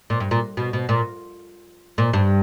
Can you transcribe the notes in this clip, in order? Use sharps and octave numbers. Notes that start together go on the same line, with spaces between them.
A#2
G2
A#2
B2
B2
A#2
A#2
G2